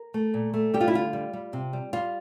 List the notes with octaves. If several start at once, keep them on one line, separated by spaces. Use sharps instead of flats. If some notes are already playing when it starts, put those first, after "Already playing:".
Already playing: A#4
A3
A#2
A3
G3 G4
F4
E4
D3 F4
G3
G3
C3
G3
G3 F4